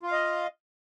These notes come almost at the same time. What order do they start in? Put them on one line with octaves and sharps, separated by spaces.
F4 F5 D#5